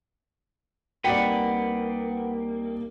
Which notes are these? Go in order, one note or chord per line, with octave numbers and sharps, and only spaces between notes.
C2 A#3 D#4 B4 D5 F#5 G5